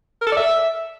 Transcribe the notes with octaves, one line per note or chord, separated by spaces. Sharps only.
A#4
A4
D5
E5